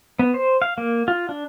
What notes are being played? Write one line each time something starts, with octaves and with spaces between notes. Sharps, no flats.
B3
C5
F5
A#3
F4
D4